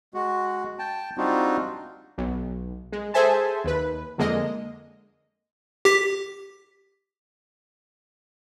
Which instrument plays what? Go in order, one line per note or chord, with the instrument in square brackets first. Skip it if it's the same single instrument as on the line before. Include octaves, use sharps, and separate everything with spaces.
[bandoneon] G#3 F#4
G5 A5
G3 C4 D4 D#4 F4 F#4
[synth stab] B1
G#3
G#4 A4 C5 E5 G#5 A5
D#2 B4
F2 D3 G#3 A#3 D#5
[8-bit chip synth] G4 B6